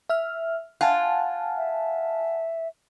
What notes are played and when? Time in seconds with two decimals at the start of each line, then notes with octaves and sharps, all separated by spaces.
0.10 E5 F6
0.81 F4 F#5 G#5 A5
1.57 E5